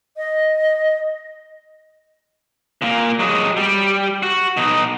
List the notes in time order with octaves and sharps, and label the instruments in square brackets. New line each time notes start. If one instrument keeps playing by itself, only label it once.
[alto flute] D#5
[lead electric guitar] A#2 A#3
F#3 G#3
G3
F#4
B2 D#4